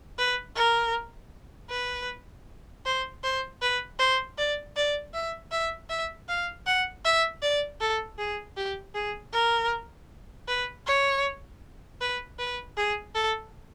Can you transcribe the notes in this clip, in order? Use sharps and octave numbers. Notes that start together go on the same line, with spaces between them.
B4
A#4
B4
C5
C5
B4
C5
D5
D5
E5
E5
E5
F5
F#5
E5
D5
A4
G#4
G4
G#4
A#4
B4
C#5
B4
B4
G#4
A4